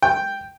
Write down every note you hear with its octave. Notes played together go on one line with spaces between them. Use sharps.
G5